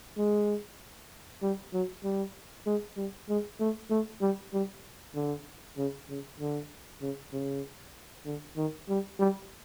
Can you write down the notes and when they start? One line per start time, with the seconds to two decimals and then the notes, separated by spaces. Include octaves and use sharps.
0.18 G#3
1.42 G3
1.73 F#3
2.04 G3
2.66 G#3
2.97 G3
3.29 G#3
3.60 A3
3.90 A3
4.21 G3
4.53 G3
5.15 D3
5.77 C#3
6.09 C#3
6.40 D3
7.01 C#3
7.33 C#3
8.26 D3
8.57 D#3
8.89 G3
9.19 G3